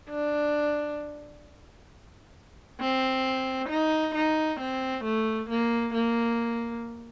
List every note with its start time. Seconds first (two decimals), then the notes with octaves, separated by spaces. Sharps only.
0.10 D4
2.81 C4
3.69 D#4
4.15 D#4
4.60 C4
5.05 A3
5.49 A#3
5.94 A#3